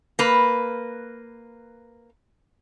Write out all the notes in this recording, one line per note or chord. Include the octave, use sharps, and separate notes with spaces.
A#3 B4